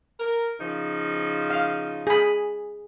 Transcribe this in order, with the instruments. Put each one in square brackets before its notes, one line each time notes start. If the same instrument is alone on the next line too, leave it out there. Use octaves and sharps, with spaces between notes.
[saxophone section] A#4
C#3 F3 D#4
[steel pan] F5
G#4 B5